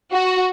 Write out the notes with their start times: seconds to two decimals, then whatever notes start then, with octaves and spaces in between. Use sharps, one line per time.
0.12 F#4